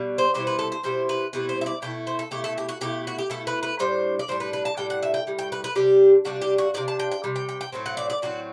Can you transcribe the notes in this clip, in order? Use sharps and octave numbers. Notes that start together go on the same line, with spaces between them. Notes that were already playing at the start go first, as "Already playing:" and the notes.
Already playing: B2 G3
C5
B2 G3 C4 E4 C5
B4
A4
C5
B2 G3 C4 E4 C5
B4
B2 G3 C4 E4 B4
C5
E5
D5
B2 A3 E4 G5
C5
A4
B2 A3 E4 G4
A4
G4
F#4
B2 A3 E4 G4
F#4
G4
B2 A3 E4 A4
B4
B4
A2 G3 D4 C5
D5
A2 G3 D4 C5
B4
B4
A5
A2 G3 D4 G5
F#5
E5
G5
A2 G3
G5
B4
B4
C3 G3 D4 G4
C3 G3 D4 F#4
G4
F#4
C3 G3 D4 D5
A5
G5
G5
C3 G3
G5
G5
G5
A2 F#3 A3 C4
F#5
D5
D5
A2 F#3 A3 C4 F#4